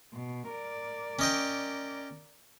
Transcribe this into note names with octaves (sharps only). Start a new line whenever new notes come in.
B2
A#4 D5
C#4 D#5 G5